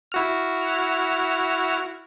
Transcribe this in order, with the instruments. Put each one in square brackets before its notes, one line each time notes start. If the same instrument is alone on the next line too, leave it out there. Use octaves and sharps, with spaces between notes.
[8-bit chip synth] E4 F#4 F6